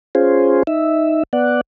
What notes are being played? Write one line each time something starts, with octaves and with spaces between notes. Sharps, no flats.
C#4 F4 G#4 C5
D#4 E5
B3 D5 F#5